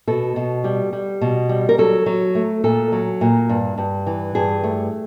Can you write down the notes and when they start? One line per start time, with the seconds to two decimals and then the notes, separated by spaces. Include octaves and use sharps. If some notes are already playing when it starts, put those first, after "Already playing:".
0.07 B2 A4
0.36 B2
0.64 G3
0.93 G3
1.21 B2
1.49 G3
1.69 A#4
1.78 F#3 A4
2.06 F#3
2.35 A3
2.64 A#2 A4
2.92 F#3
3.21 A#2
3.49 G2
3.78 G2
4.07 E3
4.35 G2 G#4
4.63 A3